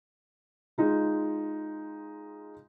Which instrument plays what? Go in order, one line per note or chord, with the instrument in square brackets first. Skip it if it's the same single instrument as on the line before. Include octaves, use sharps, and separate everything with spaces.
[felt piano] G#3 D#4 F4